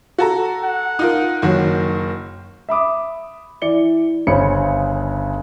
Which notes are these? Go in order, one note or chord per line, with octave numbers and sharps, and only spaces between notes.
F#4 A4 A#5
F#5
D#4 F4 A#4
F#1 D#3 F#3
E5 B5 D6 D#6
E3 D5 C#7 G7
G1 C#3 C5 C#5 B5 C#7